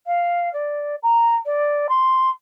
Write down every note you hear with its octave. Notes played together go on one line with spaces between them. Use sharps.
F5
D5
A#5
D5
C6